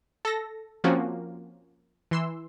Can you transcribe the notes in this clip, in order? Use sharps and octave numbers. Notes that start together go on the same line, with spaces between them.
A4 A#6
F3 A#3 C4 C#4 F4 F#4
E3 C6 E6